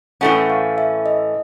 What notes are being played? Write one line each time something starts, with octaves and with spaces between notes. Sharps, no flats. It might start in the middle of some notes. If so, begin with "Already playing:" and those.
A2 E3 A3 C#4 F#5
F5
E5
D#5